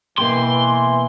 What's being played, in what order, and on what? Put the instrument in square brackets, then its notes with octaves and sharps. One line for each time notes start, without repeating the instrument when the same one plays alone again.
[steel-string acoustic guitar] B2 A#3 G5 [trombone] E3 [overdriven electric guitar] C6